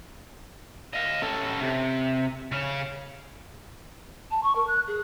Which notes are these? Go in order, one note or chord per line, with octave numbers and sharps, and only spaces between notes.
D#5 F5
C#4 A4
C3
C#3 C#4
A5
C#6
A#4
F#6
G#4